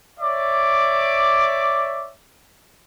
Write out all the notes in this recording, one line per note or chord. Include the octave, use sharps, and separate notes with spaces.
C#5 D5 E5 D6